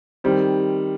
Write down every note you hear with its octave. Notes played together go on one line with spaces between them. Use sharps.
D#3 G3 C4